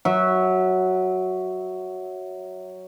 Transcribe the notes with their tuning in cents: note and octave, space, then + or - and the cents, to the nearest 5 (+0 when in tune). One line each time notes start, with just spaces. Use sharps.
F#3 +0 E5 -20